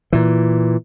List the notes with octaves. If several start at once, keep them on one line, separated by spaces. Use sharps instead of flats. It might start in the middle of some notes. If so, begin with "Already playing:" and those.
A#2 E3